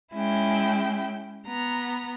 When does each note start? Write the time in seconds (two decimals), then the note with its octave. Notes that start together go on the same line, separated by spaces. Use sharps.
0.15 G#3 C#4 E4 G5
1.48 B3 A#5